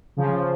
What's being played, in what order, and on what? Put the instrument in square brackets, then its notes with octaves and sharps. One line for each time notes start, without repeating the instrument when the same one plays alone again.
[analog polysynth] C#3 F3